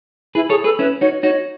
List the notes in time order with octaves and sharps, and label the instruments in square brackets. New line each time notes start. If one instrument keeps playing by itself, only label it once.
[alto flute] E4 [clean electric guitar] G#4 B4
[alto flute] G#4 [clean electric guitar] A4 C#5
[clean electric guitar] G#4 B4 [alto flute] A4
[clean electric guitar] C#4 E4 [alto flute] B4
[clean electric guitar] D#4 F#4 [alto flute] C#5
[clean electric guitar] D#4 F#4 [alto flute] C#5